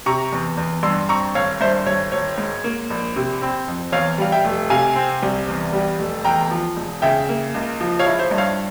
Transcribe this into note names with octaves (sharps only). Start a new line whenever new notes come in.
C3 A#5 C#6
E2
E2
G2 C6 E6
C4 A#5 C#6
G#1 C#5 F5
G2 C5 E5
G#1 C#5
G#1 C#5
G#2
A#3
A#1
C3
C4
F2
E2 C#5 F5
G3 F5
E5 G5
F1
C3 F5 G#5
C4
C2
E2
G3
F1
E2 G5 A#5
F3
E1
C#3 E5 G5
A#3
C#2
F3
C#5 F5
E4
C5 E5
G2
C#5 F5